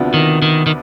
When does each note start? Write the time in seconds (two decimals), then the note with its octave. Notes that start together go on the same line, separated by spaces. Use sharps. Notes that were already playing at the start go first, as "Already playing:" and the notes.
Already playing: D2 C3 F3 B3 D4
0.14 D#3
0.42 D#3
0.67 D#3